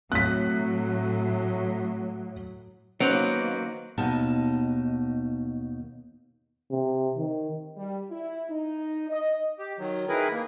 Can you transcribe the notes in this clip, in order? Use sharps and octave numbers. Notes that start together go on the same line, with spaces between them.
A2 F#3 C4 F#6 B6
D#3 F#3 A#3 B3 C#4 C5 D#5 D7
D#2 B2 D#4 D#5 A5
C3
D#3
G3
E4
D#4
D#5
G4
D#3 F#3
D#3 C4 E4 G#4 A#4 B4
A#3